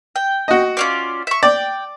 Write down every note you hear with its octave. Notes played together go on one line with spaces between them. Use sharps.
G5
F#4 D#5
C#4 F4 D5
E5 C#6
D5 G5